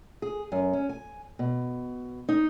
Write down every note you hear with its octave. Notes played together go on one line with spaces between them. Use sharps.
G#4
F#2
C#4
G#5
B2
D#4